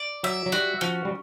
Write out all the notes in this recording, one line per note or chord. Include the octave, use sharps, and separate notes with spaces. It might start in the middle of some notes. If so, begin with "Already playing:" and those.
Already playing: D5
F#3 E5
F#3
G3 F#4
F3 C#4
G3